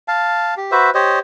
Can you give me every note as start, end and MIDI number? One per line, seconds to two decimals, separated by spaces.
0.08 0.54 77
0.08 0.54 81
0.57 0.71 67
0.72 0.90 66
0.72 0.90 71
0.72 0.90 72
0.72 0.90 76
0.94 1.19 67
0.94 1.19 72
0.94 1.19 73
0.94 1.19 75